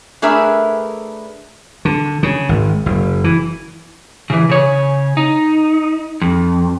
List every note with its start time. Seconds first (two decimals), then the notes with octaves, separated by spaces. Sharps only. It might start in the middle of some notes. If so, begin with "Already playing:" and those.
0.22 A3 D4 G#4 A#4 B4 E5
1.85 D3
2.23 C#3
2.49 G#1
2.86 F#1
3.24 E3
4.30 C#3 E3
4.49 C#3 C#5
5.17 D#4
6.22 F2